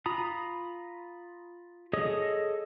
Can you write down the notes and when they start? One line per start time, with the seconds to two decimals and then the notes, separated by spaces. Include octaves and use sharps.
0.06 F4 A#5 B5 D#6
1.93 G#4 A4 C#5 D#5 D#6